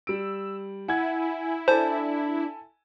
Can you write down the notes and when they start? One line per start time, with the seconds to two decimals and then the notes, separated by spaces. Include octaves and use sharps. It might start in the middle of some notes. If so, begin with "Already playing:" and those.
0.07 G3 E6 D7
0.88 E4 F#5 G#5 G#6
1.68 D4 A4 C5 G#5 A5